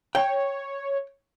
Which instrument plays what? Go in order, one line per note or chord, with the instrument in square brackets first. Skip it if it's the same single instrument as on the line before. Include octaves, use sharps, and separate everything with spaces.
[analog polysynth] C#5 [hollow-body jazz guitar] G5